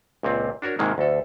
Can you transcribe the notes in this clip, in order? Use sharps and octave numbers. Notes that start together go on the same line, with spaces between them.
C#2 A#2 C4
D4 F#4 A#4 C#5
G#2 C3 D#3 G#3 A#3
D2 A4